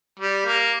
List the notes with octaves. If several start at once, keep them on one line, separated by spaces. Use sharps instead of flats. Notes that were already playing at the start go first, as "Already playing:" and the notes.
G3
A#3